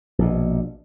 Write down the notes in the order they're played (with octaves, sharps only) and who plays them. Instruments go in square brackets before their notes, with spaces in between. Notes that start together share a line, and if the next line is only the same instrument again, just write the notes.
[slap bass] A#1 B2